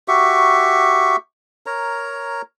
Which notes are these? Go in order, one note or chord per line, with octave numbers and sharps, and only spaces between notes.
F#4 G4 E5 C#6
A#4 C#5 A#5